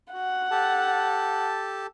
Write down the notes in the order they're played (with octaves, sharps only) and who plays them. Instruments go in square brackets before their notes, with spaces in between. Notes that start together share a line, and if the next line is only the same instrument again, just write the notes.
[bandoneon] F#4 [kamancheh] F#5
[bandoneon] G4 A4 A5